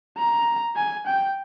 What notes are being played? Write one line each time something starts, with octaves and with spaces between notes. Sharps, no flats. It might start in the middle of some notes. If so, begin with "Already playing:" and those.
A#5
G#5
G5